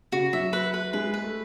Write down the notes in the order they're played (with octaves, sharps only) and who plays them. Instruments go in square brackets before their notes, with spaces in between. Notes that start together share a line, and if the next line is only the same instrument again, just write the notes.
[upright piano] C#3 [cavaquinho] F#4
[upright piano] F#3 [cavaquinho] E5
[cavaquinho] B4
B4
[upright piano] G#3 [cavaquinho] B4
[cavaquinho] B4
[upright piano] A3